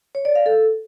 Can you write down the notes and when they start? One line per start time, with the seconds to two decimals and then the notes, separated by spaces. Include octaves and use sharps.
0.15 C#5
0.25 D5
0.35 F5
0.46 A4